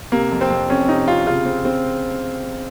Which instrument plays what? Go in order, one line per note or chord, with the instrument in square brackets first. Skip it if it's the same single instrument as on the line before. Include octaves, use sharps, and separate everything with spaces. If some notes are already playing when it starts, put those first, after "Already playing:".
[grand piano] C3 [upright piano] A#3
[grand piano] F2
[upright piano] C4
[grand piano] F2
[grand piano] F2 [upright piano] C#4
[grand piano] C3 [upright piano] D#4
[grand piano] C3 [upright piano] F4
[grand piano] C#3 [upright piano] F4
[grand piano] C4
C4